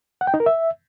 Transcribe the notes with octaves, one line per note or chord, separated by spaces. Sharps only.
F#5
G5
D#4
A#4
E5